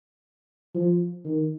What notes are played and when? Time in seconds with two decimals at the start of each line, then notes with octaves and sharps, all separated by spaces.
0.74 F3
1.25 D#3